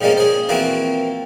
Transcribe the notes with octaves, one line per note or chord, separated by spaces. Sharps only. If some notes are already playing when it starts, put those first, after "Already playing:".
G#2 F3 G3 G#3 A#3 C#4
G#4 C5
E3 F3 A#3 C4 E4 F#4